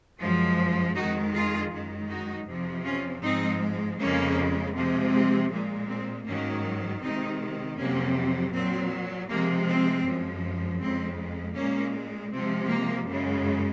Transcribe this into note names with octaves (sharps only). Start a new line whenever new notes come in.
F#2 F3 G#3
F2 D#3 G#3 D#4 F#4
F4 G#4
F#2 D#3 G#3
D#4 F#4
F2 C3 F3
C#4 F4
G#2 F3 G#3 C4 D#4
F2 C#3 G#3 A#3 C#4
C3 F3 G#3
C4
A#2 G#3
C4
G#2 D#3 F#3 A#3 C#4
C3 D#3 G#3 C4 D#4
F2 C3 F#3 A#3 C#4
A#2 F#3 C4
C3 F3 G#3 A#3
C4
F#2 F3 G#3
F2 C#3 G#3 C4
A#2 G#3 A#3 C#4
C3 F3 G#3 C4
A#3
F#2 C#3 G#3